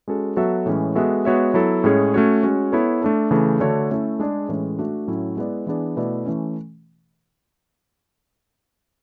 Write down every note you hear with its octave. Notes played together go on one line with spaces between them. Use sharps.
G#3 C#4 F#4 A4
F#3 B3 F#4 A4 E5
A2 E3 G#3 C#4
G#3 B3 F#4 A4 E5
G#3 B3 F#4 C#5 E5
F#3 B3 E4 A4
A2 G#3 C#4 G#4 C#5
A3 C#4 F#4 C#5
G#3 C#4 F#4
B3 E4 A4 C#5
A3 D4 A4
C#3 E3 A3
D3 A3 D4 F#4 C#5
A3 C#4 E4 A4
G#3 D4 G#4 D5
A2 E3 G#3 C#4
A3 D4 F#4
A2 F#3 C#4 E4
G#3 B3 E4 B4 D5
E3 B3 D4 G#4 D5
B2 A3 E4 B4 D5
E3 A3 C#4